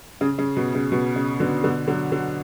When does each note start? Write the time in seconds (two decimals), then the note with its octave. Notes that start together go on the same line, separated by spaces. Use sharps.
0.21 C#3
0.39 C#3
0.57 B2
0.75 C#3
0.92 B2
1.16 C#3
1.40 B2 D3
1.64 B2 D3
1.87 D3 F#3
2.12 D3 F#3